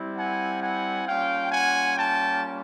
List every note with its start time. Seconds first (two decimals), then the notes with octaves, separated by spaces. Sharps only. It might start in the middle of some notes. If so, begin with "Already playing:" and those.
Already playing: G3 C4 E4
0.17 F#5 G#5
0.62 F#5 G#5
1.07 G3 A#3 C#4 F4 F5 G5
1.51 F#5 G#5
1.97 G5 A5